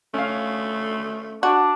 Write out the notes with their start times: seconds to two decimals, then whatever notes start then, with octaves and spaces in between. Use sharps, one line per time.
0.14 A3 C#4 F5
1.43 D4 F#4